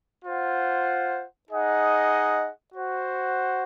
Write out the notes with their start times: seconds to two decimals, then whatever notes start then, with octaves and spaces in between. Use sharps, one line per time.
0.24 F4 C5 F#5
1.49 D#4 G#4 D#5 F#5
2.74 F#4 C5 F#5